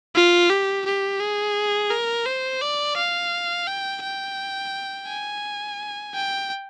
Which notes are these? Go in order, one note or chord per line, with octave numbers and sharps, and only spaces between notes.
F4
G4
G4
G#4
A#4
C5
D5
F5
G5
G5
G#5
G5